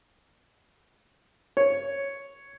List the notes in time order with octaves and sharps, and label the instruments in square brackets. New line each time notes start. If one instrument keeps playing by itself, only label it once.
[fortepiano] C#5